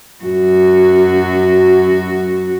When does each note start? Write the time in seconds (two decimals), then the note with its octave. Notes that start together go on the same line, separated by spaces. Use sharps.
0.25 F#2 F#4